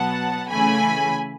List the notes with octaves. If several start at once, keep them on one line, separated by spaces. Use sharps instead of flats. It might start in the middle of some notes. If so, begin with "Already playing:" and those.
Already playing: B2 F#3 B3 F#5 A5
C#3 E3 A3 G#5 B5